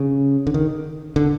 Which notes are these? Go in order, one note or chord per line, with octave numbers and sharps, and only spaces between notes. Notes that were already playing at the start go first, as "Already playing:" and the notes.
Already playing: C#3
D3
D#3
D3